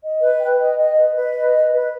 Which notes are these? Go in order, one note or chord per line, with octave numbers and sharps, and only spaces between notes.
D#5
B4
G5
D#5
D#5
B4
B4
D#5
B4
B4